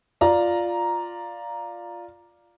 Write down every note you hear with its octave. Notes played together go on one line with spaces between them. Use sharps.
F4 D5 A#5